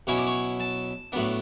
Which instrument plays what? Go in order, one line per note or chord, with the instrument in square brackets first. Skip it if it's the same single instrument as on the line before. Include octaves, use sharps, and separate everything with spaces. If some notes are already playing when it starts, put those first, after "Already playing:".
[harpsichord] B2 F#3 C#4 E4 C#5
D5
C#5
A5
A2 F#3 B3 D4